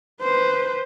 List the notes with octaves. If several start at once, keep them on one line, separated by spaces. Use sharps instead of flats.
B4 C5